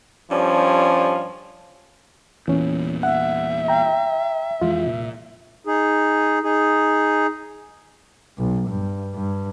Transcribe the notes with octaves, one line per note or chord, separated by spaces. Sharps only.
G2 F3 G3 C#4
E2 A#2 E3 C#4
E5 F#5
G5 A#5
F2 E3 G#3 F4
C2 A#2
D#4 G#4
D#4 G#4
B1
G2
G2